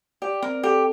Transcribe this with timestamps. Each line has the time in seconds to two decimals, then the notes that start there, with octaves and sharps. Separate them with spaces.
0.22 G4 D5
0.42 C4 A#4
0.63 G4 A4